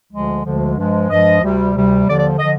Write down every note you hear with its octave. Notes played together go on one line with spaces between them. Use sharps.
D2 D3 F3 G#3
D2 D3 F3 G#3
G2 F3 G#3
G2 F3 G#3 D#5
D2 C3 G3
D2 C3 G3
D#2 D3 F3 D5
D5
D3 F3 D#5